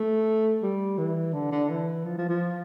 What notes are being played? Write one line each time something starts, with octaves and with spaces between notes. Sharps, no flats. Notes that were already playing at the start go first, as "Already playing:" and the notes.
Already playing: A3
G3
E3
D3
D3
E3
F3
F3
F3